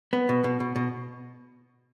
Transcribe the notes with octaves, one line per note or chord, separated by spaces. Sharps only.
B3
B2
B2
B2
B2